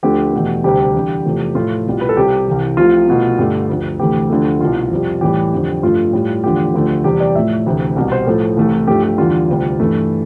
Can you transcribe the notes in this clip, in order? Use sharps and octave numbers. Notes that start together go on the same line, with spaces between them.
D2 D3 F3 A3 G4
E2 B2 A3
D2 C3 G3 G4
E2 D3 G3
E2 C3 F3 A3
A2 F3 A3 F4
C2 B2 G3
B4
A4
C2 C3 G3 G4
C2 C3 E3
C2 C3 F3 A3 F4
C2 B2 A3
G2 D3 A3 G4
D2 D3 F3
D2 C3 E3 A3 G4
D2 D3 F3 A3
C2 B2 G3 F4
F2 C3 G3
A2 E3 G3 G4
F2 D3 G3
G2 F3 A3 F4
A2 G3
E2 D3 F3 A3 G4
D2 D3 F3 A3
E2 C3 G3 G4
D5
A2 F3 A3 E5
D2 C3 E3
C2 B2 G3
C5
A2 F3 A3 A4
C2 C3 E3 A3
G2 F3 A3 G4
G4
E2 D3 G3 F4
D2 C3 G3
G2 E3 A3